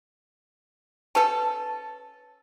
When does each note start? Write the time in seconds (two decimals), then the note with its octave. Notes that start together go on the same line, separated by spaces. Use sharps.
1.15 C#4 A4 B4 A5